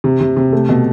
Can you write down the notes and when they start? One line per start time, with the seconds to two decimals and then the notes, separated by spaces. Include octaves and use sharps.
0.04 C3
0.21 C3
0.37 C3
0.53 A3
0.69 B2